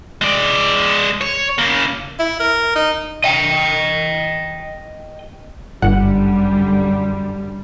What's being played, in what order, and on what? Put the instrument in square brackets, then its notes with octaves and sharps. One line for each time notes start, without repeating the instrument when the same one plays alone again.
[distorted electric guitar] G#3 D5
C#5
C#3 A#3
[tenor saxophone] E4
A#4
D#4
[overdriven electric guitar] D#5 G5
[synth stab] G1 F#5 [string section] F#2 D3 G3